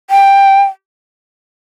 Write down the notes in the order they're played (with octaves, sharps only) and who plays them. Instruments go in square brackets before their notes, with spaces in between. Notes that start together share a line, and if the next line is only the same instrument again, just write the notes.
[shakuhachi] G5